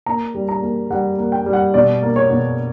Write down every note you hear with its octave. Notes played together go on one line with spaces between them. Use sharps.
A#3 A#5
G3
A#5
A#3
G3 F#5
A#3
G5
G3
F#5
B2 D5
A#3
C#5
B2